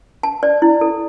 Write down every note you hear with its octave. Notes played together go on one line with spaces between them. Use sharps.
A5
D5
E4
A4